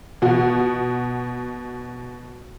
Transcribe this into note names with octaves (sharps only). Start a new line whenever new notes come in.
B2 F#4